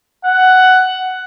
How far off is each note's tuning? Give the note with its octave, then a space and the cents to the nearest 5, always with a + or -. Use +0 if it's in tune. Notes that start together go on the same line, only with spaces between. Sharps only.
F#5 +10